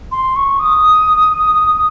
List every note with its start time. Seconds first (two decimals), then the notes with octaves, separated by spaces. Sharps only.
0.12 C6
0.36 C#6
0.59 D#6